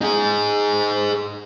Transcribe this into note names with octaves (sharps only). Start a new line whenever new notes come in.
D#4 G#4